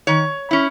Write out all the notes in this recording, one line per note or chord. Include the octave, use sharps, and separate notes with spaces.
D#3 C#5
C#4 E4